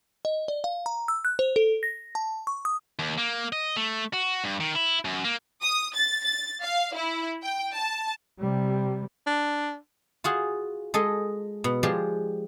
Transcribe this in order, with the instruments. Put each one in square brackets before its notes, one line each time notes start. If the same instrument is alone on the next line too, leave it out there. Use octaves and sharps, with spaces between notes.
[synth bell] D#5
D5
F5
A#5
E6
F#6
C5
A4
A#6
A5
C#6
D#6
[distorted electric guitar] D#2
A#3
D#5
A3
F#4
G2
D#3
E4
F#2
A#3
[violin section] D#6
A6
A6
F5
E4
G5
A5
[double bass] C3 G3
[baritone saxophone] D4
[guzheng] F4 F#4 G#4
G#3 A4 D#5
B2
F3 G#3 G4 D5 C6